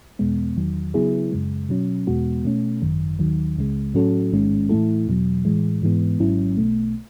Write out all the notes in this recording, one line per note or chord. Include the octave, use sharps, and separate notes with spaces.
E2 B2 G#3 B3
E2 D#3 F#3
C#3 F#3 B3 E4 G#4
F#2 C#3 G#3
B2 F#3 C#4
E2 B2 G#3 B3 F#4
B2 A3 C#4
G#1 F#2 D#3
D#2 D#3 F#3
C#2 C#3 G#3
A2 F#3 C#4 F#4 A4
A1 G#2 D#3 G#3 C#4
A2 E3 A3 E4 A4
E2 B2 F#3
A2 E3 G#3
G#2 E3 G#3 B3
G#1 G#2 F#3 C#4 E4
B1 B2 A3